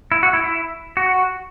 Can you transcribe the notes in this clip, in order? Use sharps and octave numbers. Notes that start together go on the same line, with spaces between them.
E4
F#4
E4
E4
F#4